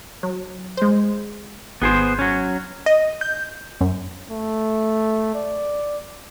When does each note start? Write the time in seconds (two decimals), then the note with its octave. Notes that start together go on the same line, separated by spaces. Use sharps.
0.23 F#3
0.77 G#3 C5
1.82 G#1 B3 G#4 C5
2.19 F#3 C#4
2.86 D#5
3.21 G6
3.81 F#2
4.31 A3
5.35 D5